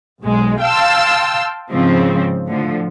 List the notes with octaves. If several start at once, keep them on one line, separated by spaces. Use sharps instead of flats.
B1 G#3
F5 G5 A5 C6 E6
G#2 C#3 F3 C4
A2 D3 F3